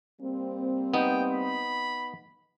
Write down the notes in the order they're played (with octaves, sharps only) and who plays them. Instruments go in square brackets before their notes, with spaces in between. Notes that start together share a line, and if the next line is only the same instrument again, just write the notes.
[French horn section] G3 A#3 C4
[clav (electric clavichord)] B3 D#4 [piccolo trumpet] G5
[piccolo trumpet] B5